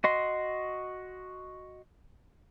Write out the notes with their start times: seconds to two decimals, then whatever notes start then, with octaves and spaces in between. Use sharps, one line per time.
0.04 F#4 D#5 C6